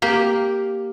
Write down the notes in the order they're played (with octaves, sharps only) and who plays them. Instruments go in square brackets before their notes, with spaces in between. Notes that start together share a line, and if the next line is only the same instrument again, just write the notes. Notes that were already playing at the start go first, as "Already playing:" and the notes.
[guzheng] A#3 G4